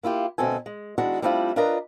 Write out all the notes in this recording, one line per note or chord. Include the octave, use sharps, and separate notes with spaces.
A#3 E4 F4 G4
D2 B2 C4 A4 G#5
G#3
D#3 G#3 D4 E4 F#4
G3 A3 C4 D4 E4 F4
D4 F4 A#4 B4 D#5 A#5